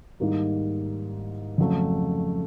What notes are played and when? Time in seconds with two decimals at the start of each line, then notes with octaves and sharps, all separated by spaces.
0.20 G#2 D#3 G3 A#3 D#4
1.58 F2 C#3 F#3 A3